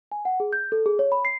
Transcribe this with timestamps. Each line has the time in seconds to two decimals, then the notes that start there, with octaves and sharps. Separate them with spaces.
0.12 G#5
0.25 F#5
0.40 G#4
0.53 G6
0.72 A4
0.86 G#4
0.99 C#5
1.12 B5
1.25 C7